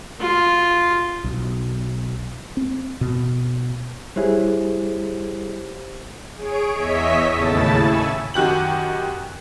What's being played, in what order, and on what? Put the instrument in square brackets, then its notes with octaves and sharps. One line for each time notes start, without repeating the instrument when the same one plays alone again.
[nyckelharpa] F4
[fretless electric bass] B1
C4
B2
[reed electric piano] G3 E4 G#4 [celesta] G4 C5 C#5
[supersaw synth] G#4 C#5 D7
E2 C#5 D#5 E5 B6
D#2 A2 C#3 E4 A5 A6
G#5 B5 C#6 E6
[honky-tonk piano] F#2 D#3 F#4 G4 F#7